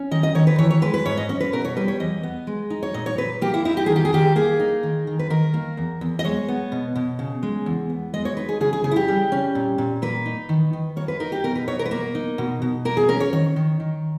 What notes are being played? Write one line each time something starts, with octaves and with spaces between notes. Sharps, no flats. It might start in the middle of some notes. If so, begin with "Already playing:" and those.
Already playing: C#4
D#3 D#5
D#5
D#3 C#5
B4
E3 C#5
C#5
G#3 B4
B4
G#2 C#5
D#5
C#4 C#5
B4
B2 A#4
C#5
G3 B4
C#5
E2 D#5
B3
G#3
D#4
C#5
A#2 D#5
C#5
A#2 B4
A#3 G4
E4
D#4 E4
G4
D#3 G#4
G4
G#4
D#3 G4
A#3 G#4
D#4
D#3
D#3
B4
D#3 A#4
A#3
E2
E2
D#5
G#3 C#5
B3
B2
B2
C#3
G#3
E2
B3
G#3 D#5
C#5
D#4 B4
G#4
C#3 G#4
G#4
C#3 G#4
E4
G4
G3
C#4
A#2
A#2
A#3 B4
D#4
D#3
D#3
A#3 C#5
B4
D#4 A#4
G4
B2 A#4
B4
B2 C#5
A#4
B4
A#3 A#4
D#4
B2
B2
A#3 A#4
G#4
C#4 A#4
C#5
D#3 C#5
D#3
D#3